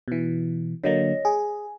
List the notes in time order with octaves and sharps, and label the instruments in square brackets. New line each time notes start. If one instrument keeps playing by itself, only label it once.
[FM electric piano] B2 E3
[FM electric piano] D3 F#3 A#3 [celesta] C#5 D#5 A#6
[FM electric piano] G#4 [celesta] G#5